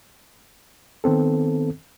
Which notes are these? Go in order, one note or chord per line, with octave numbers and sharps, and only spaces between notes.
D#3 B3 C4 A4